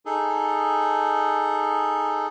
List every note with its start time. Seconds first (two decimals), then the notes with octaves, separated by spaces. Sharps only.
0.06 D#4 G#4 A4